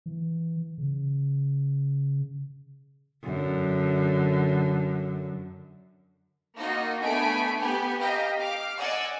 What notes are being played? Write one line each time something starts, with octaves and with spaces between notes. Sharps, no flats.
E3
C#3
F#2 D3
A#3 D#4 F4 F#4 D#5
A3 B3 D4 G#5 B5 D7
B3 G4 G#5
G4 D#5 F5 G5 A#5
F5 D6 F6
D5 D#5 F#5 G#5 E6